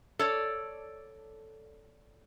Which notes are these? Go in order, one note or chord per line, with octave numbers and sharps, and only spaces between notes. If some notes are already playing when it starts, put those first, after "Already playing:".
A4 C#5 D5